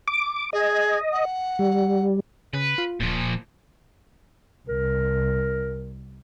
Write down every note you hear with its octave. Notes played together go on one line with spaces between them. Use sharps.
D6
G#4 D#5
F#5
G3
C#3 B4
F4
D1 A#2 F3
C2 A#4